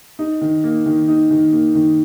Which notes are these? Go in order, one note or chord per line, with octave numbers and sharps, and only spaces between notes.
D#4
D#3
A#3
D#3
D#4
D#3
A#3
D#3